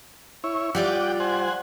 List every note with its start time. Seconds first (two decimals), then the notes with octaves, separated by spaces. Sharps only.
0.44 E4 C#5
0.75 G3 F4 D5 F#5 G5 D6
1.20 C5 F#5 G#5